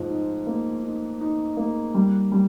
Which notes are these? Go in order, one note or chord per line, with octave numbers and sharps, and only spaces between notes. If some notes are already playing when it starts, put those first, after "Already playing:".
Already playing: G#2 F3
D#4
A#3
D#4
D#4
A#3
G3
G3